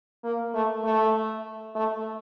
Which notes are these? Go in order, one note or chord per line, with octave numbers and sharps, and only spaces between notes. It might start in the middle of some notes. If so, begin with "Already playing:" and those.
A#3
A3
A3
A3